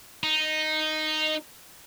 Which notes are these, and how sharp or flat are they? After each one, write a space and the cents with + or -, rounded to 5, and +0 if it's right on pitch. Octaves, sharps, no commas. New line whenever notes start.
D#4 -5